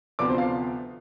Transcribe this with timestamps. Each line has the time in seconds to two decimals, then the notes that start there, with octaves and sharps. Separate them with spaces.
0.19 D2 C3 F3 B3 D5 D6
0.29 C5 C6
0.38 F5